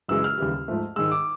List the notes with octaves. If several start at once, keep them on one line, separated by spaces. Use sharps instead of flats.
F#2 C#3 E3 G#3 E6
F6
D#2 C#3 E3 G3
G#2 F3 A3
G#2 D#3 G#3 E6
D6